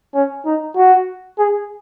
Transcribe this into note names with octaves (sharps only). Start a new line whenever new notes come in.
C#4
D#4
F#4
G#4